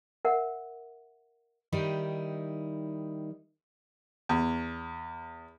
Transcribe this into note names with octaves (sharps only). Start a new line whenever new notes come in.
A#4 E5 F#5
D#3 G3 D#4 E4
E2